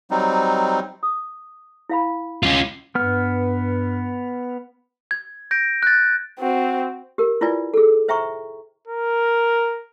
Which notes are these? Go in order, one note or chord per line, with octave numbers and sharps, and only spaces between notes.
F#3 G3 C4 D#4
D#6
E4 F5 B5
C#4 F4
G2 B3 F6
G#6
G6 A#6 D7
F#6 A6
C4 F#4
G4 A#4
E4 F4 B4 D5 G#5
G#4 A4
C5 E5 G5 A#5 C#6
A#4